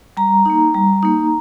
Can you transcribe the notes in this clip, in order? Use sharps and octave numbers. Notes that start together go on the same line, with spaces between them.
G3 A#5
A#3 D#4
G3
A#3 D#4